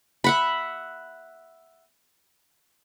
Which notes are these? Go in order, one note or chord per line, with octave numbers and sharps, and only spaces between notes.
E5 F#5 B5